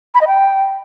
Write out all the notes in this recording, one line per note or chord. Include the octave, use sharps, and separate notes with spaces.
B5
D#5
G5